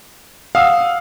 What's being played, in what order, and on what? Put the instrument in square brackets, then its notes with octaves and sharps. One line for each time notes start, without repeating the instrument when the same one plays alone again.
[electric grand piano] F5 [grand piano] F#5 D#6 E6